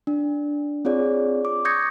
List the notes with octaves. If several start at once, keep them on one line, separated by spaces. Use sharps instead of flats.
D4
C4 F4 G#4 C#5 D5
D6
C#6 D#6 G6 G#6 A#6 C#7